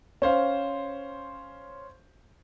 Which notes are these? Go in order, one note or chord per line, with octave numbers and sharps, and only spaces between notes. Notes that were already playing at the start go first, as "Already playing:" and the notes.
C#4 C5 F5